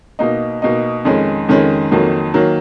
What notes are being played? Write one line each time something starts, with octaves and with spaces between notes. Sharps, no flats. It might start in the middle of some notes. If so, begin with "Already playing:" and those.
B2 A#3 D#4
B2 A#3 D#4
F2 D#3 G#3 C#4
F2 D#3 G#3 C#4
F2 D#3 F#3 A#3
D#3 F#3 A#3